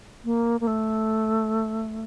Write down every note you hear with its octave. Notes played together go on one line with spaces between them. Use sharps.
A#3
A#3
A3